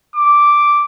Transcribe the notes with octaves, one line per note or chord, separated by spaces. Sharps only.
D6